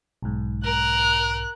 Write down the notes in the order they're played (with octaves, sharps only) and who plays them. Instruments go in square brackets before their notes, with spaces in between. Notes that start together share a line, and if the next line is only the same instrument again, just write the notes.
[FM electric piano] B1 G#2
[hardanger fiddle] A#4 [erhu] F#6